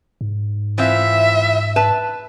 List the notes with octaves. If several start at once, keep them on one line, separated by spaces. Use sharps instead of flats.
G#2
E3 C4 F4 E5
B4 A5